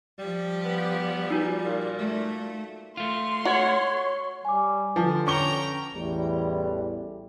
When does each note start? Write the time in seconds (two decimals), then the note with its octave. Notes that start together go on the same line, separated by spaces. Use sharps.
0.19 F3 G3 G4
0.64 B3
1.30 D#4 F4 F#4
1.65 A#2
1.99 A3
2.97 A3 F4 C6
3.45 F#4 C#5
4.45 G3 G#5 D6
4.96 D3 F3 B4 A5
5.27 C#4 G5 A#5 C#6 G7
5.94 A1 E2 A2 G3